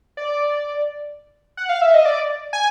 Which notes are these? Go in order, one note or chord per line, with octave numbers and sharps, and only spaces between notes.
D5
F#5
F5
E5
D#5
D5
G#5